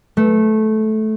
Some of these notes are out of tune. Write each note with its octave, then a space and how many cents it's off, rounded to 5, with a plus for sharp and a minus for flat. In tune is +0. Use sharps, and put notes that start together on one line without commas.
A3 -15